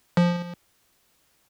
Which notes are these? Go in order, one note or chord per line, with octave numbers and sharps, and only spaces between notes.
F3